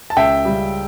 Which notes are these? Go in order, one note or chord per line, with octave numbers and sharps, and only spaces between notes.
A5
C#2 E5 G5
C#3 G3